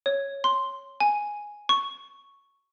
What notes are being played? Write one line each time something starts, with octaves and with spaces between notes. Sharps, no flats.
C#5
C6
G#5
C#6